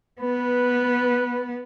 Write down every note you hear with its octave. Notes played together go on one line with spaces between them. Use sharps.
B3 B4